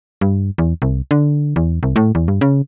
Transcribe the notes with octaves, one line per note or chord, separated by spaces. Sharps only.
G2
E2
C2
D3
E2
C2
A2
E2
G2
C#3